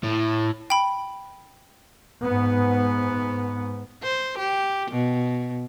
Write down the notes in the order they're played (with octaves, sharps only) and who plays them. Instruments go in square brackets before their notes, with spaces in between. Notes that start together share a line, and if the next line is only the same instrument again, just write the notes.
[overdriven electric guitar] A2
[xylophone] G5 B5
[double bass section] G#2 B3
[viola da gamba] C5
G4
B2